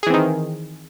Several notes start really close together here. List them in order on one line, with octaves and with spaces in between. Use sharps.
G#4 E3 C4 D#3